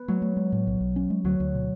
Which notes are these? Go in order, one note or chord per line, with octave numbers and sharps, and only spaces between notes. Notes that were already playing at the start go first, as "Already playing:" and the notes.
Already playing: B3
F#3 A3
A3
G#3
A2
B1
B1
C#4
G#3
D2 F#3
D2
B2